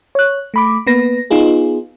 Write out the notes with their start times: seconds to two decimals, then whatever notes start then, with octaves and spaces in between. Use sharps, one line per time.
0.15 C#5 F#6
0.54 A3 B5 D6
0.87 A#3 B3 B4 A#6
1.30 B3 D#4 F4 G#4